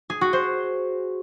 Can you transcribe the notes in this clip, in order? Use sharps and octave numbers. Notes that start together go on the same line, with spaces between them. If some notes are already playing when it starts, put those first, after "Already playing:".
G#4
F#4
C5